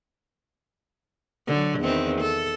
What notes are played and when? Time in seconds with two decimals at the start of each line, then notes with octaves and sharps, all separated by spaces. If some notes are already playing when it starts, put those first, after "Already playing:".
1.47 D3 F#3
1.80 E2 D#3 C4
2.21 A4